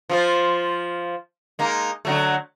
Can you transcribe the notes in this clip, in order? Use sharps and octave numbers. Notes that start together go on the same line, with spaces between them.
F3 F4 C5
G#3 A#3 D#4
D3 F#3 A3